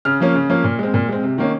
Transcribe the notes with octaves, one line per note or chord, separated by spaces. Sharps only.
C#3 F6
F3 A#3 C#4
C#3
F3 A#3 C#4
A#2
G#3 C4
A#2
G#3 C4
C3
D#3 A#3 C#4